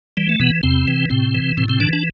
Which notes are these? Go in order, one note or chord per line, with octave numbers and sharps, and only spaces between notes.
E3 G3
A3
B2 E3 B3
E2 C3 C4
E3
A2 C3 C4
E3
A2 C3 C4
C3 C4
D3 E3 D4
D4